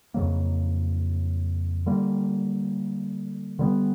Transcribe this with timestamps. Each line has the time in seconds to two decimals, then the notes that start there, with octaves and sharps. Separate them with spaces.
0.14 F2 C#3 F#3 A#3
1.86 D3 G3 A#3
3.59 D3 G3 B3